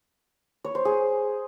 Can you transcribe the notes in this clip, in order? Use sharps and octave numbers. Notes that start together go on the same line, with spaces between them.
C#5
C5
G#4